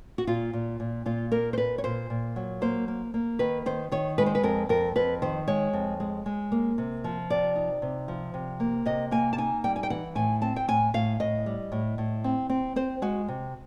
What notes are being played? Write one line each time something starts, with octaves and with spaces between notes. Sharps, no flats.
F#4
A#2 F4
A#2
A#2
A#2 F4
A#3 A#4
C5
A#2 B4
C#5
A#2 C5
A#2
F#3
A#3 C5
A#3
A#3
D#3 B4
D#3 C5
D#3 C#5
G#3 B4
C5
B4
F2 A#4
F2 A#4
F2 B4
D#3 C5
G#3 C#5
F2
G#3
G#3
A#3
C3
F3
C3 D5
D#4
C3
F3
C3
A#3
C3 D#5
A#3 G#5
A5
D#4 G#5
G3 G5
G#5
G5
E3 F#5
A2 G#5
C4 A5
G5
A2 G#5
A2 F5
A2 D#5
G3
A2
A2
C4
C4
C4 C5
G#3 F#4
C3